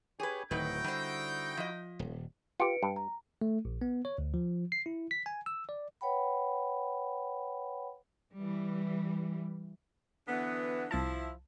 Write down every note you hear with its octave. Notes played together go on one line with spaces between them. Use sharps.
G4 G#4 B4 C#5 G#5
D1 D#3 D#4 E4 F#4 B4 G5
D3 G3 C5
F3 D#5
D#1
F4 G4 B4 C#7 D7
G2
A#5
A3
A#1
B3
C#5
D2
F3
C7
E4
B6
G#5
E6
D5
B4 C#5 F#5 G5 B5
E3 G3
D3 E3 B3
C2 F3 E4 A5